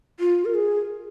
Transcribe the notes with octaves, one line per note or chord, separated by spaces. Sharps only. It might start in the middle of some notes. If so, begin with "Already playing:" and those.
F4
A#4
G#4